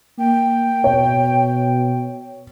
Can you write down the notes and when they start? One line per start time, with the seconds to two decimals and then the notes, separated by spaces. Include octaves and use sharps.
0.18 A#3 G5
0.84 B2 C#5